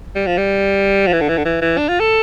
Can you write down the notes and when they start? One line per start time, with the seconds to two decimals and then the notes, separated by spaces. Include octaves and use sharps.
0.15 G3
0.27 F3
0.38 G3
1.07 F3
1.13 E3
1.21 D3
1.29 E3
1.37 D3
1.45 E3
1.61 E3
1.78 D4
1.89 F4
2.00 A4